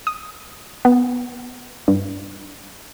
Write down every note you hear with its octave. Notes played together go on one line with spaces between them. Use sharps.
D#6
B3
G2